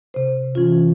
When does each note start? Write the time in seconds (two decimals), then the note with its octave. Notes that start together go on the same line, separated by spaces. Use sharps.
0.14 C3 C5
0.55 E3 C#4 F4